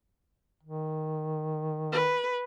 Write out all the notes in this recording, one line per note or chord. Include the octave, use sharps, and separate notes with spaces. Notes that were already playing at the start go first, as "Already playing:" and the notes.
D#3
B4